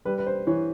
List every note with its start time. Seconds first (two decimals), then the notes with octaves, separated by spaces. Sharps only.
0.05 G3 B4
0.18 B4
0.26 C5
0.47 E3 C#5